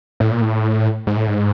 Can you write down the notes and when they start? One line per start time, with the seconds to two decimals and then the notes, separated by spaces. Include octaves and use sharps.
0.20 A2
0.31 A#2
0.42 A2
1.07 G#2
1.17 A2
1.28 G#2